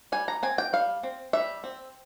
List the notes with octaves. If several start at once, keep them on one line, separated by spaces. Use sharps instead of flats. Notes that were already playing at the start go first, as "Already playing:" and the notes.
G3 G#5
A#5
C4 G#5
G5
G3 F5
C4
G3 E5
C4